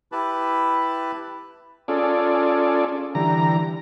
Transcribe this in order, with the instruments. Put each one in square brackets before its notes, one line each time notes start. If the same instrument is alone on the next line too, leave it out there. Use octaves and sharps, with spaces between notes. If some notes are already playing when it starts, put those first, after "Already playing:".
[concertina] E4 G4 B4 A5 B5
[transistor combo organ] C#4 F4 G#4 A4 D5
D3 E3 G3 A#5